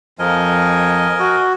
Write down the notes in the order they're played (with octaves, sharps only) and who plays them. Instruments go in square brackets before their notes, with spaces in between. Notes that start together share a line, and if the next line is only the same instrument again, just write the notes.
[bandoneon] F2 F3 [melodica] A#4 D#5 G#5
[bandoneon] F#4